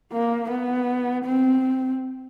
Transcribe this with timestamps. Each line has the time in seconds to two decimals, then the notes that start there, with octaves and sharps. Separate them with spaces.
0.12 A#3
0.50 B3
1.24 C4